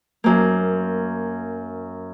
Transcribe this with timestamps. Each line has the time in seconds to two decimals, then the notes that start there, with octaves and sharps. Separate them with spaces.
0.24 F#2 A#3